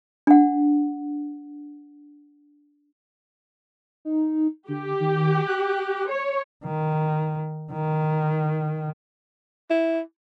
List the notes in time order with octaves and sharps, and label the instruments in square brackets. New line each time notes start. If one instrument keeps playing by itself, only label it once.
[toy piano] D4 F#5
[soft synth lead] D#4
[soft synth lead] D3 [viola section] G4
[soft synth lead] D#3
F#6
[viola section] C#5
[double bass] D#3
D#3
[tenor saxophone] E4